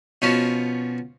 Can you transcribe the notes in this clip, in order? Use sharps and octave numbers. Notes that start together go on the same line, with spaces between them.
B2 F3 C#4